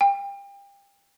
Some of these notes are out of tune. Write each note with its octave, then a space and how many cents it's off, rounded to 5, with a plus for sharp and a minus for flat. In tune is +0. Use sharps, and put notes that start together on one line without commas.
G5 +30